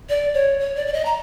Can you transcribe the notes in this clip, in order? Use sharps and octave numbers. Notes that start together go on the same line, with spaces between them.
D5
C#5
C#5
D5
D5
D#5
A#5